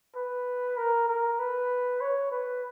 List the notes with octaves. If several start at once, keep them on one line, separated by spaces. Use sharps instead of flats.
B4
A#4
A#4
B4
C#5
B4